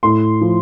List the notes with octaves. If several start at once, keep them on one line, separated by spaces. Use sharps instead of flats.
A2 C6
F3